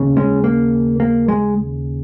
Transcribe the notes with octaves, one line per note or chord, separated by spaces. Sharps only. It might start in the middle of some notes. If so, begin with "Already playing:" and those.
Already playing: D#2 C#3
G#3 C#4
A#3
A#3
G#3